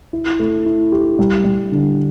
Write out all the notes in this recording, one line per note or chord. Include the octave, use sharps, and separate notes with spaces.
E4
A3
E4
G4
G3
G3
D3